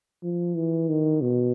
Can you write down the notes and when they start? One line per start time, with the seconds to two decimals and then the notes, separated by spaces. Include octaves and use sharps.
0.23 F3
0.56 E3
0.89 D#3
1.21 B2